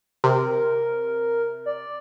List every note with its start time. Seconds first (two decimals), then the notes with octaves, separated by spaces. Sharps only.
0.24 C3 A#4
1.66 D5